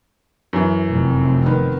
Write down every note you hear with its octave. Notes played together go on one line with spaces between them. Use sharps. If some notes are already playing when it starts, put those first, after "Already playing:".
F#2 E3
F1 C4
D#3 B3